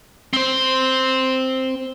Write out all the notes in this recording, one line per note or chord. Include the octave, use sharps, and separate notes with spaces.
C4 C5